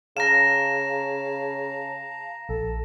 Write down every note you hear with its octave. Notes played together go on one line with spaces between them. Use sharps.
C#3 F5 A5 A#5 A#6 E7
A#1 A4